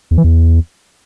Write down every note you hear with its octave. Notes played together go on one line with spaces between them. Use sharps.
E2
E3
E2